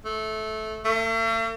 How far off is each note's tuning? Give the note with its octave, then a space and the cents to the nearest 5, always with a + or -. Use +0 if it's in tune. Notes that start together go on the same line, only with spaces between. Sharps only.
A3 -15
A3 +45